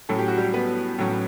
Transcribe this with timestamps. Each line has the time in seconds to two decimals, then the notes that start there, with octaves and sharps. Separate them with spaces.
0.09 A2 F#3 C#4 A4
0.19 G4
0.28 F#4
0.37 G3 G4
0.54 B3 B4
0.98 A2 F#3 C#4